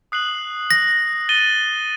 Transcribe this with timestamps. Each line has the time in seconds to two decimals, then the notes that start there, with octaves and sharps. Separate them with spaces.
0.12 D#6 F#6 C7 F#7
0.71 A#6
1.29 A6 D#7 G7